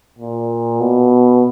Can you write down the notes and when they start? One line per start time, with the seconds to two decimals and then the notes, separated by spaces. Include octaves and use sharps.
0.18 A#2
0.81 B2